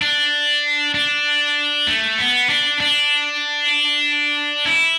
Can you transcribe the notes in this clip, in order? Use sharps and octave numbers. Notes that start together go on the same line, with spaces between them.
D4
D4
A3
B3
D4
D4
E4